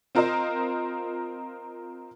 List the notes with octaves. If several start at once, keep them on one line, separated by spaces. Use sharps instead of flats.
C4 F4 A#4 C5 D#5